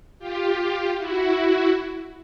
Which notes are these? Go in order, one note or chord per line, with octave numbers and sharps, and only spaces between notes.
F4 G4
E4 F#4